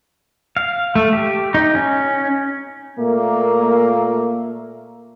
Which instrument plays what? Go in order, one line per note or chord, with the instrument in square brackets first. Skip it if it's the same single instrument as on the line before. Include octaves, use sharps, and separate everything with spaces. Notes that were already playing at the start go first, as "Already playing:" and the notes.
[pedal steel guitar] F5
A3
G4
D#4
C#4
[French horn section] A#2 A3 A#3